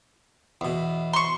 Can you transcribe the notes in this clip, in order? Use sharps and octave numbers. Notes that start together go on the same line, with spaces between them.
E2 B2
C6 C#6